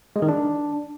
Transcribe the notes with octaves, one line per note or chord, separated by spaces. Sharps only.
G#3
D#3
D4